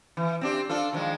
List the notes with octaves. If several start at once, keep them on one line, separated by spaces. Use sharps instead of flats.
E3
C4 D4 G4
D4 F4 A4
D#3 F3 G#3